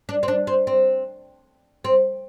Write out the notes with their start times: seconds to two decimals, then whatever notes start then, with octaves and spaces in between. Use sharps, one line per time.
0.09 D4
0.23 C4
0.28 D4
0.47 C4
0.67 C4
1.84 C4